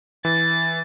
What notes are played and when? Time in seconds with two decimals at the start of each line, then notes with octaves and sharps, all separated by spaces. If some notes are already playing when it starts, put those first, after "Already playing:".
0.25 E3 A6